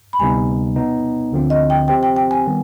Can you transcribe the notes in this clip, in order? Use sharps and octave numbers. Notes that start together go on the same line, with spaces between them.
B5
D2 C3 G3 B3 D#4 G#5
B2 B3 D#4
D2 D3 F3 C4 F4
D#5
G5
F3 C4 G4 C5 G5
G5
G5
G#5
D#3 G3 B3